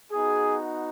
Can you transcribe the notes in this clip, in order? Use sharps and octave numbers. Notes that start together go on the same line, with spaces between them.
B3 D#4 F#4 G#4